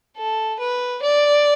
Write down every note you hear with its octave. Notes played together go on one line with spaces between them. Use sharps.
A4
B4
D5